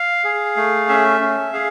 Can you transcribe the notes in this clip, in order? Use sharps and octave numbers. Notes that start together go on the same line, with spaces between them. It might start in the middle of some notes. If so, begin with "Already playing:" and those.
Already playing: F5
G#4
A3
C#4 E5
C#4
G#4 F5